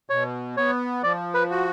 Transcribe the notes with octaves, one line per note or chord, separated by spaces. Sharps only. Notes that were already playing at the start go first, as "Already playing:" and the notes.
B2 C#5
B3 C#5
F3 D5
B4
F#4